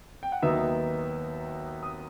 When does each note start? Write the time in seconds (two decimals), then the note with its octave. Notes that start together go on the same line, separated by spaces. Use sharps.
0.23 G5
0.32 F#5
0.42 D#2 D#3 F#3 B3 D#4 E5
1.83 D#6